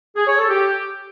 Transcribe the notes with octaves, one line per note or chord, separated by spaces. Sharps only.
G#4
C#5
A4
G4